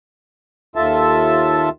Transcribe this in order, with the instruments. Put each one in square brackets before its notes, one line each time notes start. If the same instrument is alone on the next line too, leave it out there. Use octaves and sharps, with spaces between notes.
[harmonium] D#2 F4 A4 E5 A5